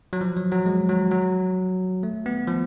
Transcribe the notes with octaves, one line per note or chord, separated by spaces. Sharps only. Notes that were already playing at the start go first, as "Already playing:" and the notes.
F#3
F3
F#3
F#3
G#3
F#3
F#3
A3
B3
F3